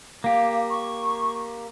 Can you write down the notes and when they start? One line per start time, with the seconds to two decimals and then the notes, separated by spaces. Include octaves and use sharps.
0.24 A#3 G4 F5
0.69 C#6